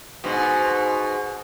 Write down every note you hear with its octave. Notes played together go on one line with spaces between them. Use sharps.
G#2 B2